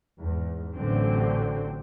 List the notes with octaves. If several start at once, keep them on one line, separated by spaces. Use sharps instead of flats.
E2 G#2
A1 D3 F#3 C4